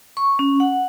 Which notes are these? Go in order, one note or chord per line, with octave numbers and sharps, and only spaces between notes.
C#6
C#4
F#5